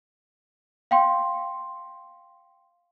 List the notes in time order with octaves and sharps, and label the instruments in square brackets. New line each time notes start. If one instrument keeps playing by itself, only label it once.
[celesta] F5 G5 C6